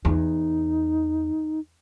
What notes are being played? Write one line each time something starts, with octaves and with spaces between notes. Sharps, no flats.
E2 D#4